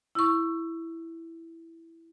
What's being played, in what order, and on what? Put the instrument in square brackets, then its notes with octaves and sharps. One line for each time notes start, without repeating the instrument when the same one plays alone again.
[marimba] E4 C#6